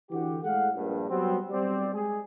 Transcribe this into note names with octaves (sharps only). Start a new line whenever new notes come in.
D3 E3 F#4 G4
A2 G#3 G#4 A4 F5 F#5
A#1 G2
F#3 G3 B3 C4
B1 G3 C4 D5
G#3 G#4